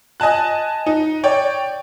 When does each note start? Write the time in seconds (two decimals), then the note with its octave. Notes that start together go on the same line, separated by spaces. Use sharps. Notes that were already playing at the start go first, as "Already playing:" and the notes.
0.20 D#5 G#5 A5 F#6
0.86 D#4
1.24 C#5 D5 G5